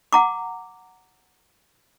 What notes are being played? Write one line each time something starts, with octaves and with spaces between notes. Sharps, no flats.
F#5 A#5 D6